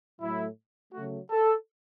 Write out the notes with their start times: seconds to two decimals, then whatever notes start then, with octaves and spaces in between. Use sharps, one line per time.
0.20 A2 F#3 A3 E4
0.93 C#3 F#3 A3 F#4
1.31 A4